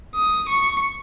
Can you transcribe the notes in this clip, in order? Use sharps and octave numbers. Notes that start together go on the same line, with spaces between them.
D#6
C#6